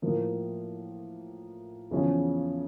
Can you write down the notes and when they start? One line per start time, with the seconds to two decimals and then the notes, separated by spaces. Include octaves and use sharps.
0.02 A2 F3 A#3
1.91 E2 C#3 F3 C#4